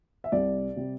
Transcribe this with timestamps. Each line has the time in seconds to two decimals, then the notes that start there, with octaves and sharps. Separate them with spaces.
0.24 E5
0.32 C2 C3 G3 D5
0.76 C3 G3